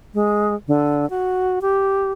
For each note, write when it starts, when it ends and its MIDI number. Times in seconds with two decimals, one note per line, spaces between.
0.14 0.55 56
0.68 1.08 50
1.10 1.59 66
1.62 2.12 67